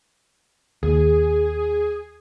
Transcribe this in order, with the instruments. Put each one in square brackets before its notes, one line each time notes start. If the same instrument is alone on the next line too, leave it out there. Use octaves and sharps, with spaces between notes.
[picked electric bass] D#2 [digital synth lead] G#4